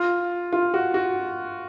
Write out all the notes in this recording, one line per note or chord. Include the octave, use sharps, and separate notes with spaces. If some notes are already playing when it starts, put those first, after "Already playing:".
Already playing: F4
F4
F#4
F#4